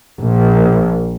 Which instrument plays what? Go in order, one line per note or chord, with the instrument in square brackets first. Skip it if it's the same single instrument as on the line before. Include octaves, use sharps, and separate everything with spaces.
[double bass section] A#1